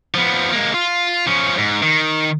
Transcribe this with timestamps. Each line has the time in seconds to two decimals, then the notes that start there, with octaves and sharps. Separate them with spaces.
0.15 F3 B3
0.52 G#3 A#3
0.74 F4
1.27 F3 C#4
1.58 G#2
1.83 D#3